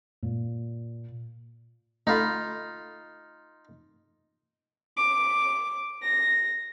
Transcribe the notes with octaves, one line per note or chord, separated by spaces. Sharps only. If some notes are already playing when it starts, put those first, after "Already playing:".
A#2
A3 D#4 F4 B5
D6
A#6